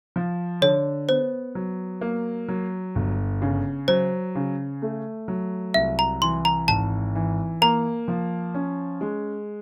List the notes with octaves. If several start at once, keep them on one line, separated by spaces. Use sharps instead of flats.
F3
D3 C#5
B3 C5
F#3
A#3
F#3
G1
C#3
F#3 C5
C#3
A3
F#3
C2 E5
A#5
E3 C6
A#5
G#1 A5
E3
A#3 A#5
F3
C#4
G#3